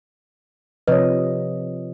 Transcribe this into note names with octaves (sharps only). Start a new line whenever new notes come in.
C3 F3 B4 C#5 D#5